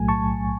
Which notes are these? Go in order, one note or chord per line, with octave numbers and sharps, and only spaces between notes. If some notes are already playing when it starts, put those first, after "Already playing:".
Already playing: B1 A2 F#3 A3 G#5
A5 C#6